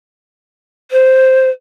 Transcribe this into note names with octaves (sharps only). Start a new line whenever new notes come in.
C5